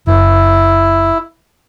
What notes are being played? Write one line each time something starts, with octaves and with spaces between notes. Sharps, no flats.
F#1 E4